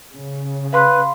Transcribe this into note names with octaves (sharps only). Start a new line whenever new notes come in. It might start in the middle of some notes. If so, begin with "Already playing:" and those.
C#3
B4 F5 B5 C6